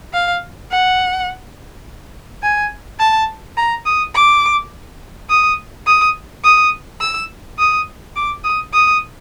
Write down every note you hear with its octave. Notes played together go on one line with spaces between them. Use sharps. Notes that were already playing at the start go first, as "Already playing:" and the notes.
F5
F#5
G#5
A5
A#5
D#6
D6
D#6
D#6
D#6
E6
D#6
D6
D#6
D#6